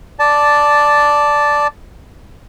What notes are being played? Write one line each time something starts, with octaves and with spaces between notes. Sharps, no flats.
D5 A5